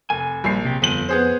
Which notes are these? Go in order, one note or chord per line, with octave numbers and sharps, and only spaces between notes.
F1 G#5
A#1 G3 C7
B1 C3 G4
G1 F2 D#7 F#7
B3 G#4 C5